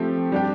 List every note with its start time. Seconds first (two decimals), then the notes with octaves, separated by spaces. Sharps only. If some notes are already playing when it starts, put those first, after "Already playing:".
Already playing: F3 A3 C4 G4
0.32 G3 D4 G4